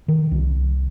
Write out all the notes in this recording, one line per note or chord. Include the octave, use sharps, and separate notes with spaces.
D#3
C2